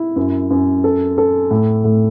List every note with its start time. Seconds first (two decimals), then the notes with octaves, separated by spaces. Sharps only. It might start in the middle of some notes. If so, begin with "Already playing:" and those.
Already playing: E4
0.16 F#2
0.50 F#2
0.84 A4
1.18 A4
1.51 A2
1.84 A2